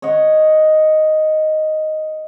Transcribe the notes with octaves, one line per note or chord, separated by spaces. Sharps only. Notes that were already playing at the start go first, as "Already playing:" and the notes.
C#5 D#5 F#5